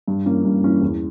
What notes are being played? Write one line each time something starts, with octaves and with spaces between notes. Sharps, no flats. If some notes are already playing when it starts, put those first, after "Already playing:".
G2
E3 A#3 C#4
G2
E3 A#3 C#4
E2